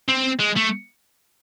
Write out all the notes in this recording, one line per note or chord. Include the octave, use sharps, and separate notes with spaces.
C4
G#3
A3